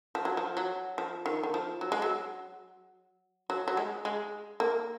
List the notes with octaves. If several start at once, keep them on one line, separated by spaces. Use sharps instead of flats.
F3
F#3
F3
F#3
F3
D#3
D#3
F3
F#3
G#3
F#3
F#3
F#3
G#3
G#3
A#3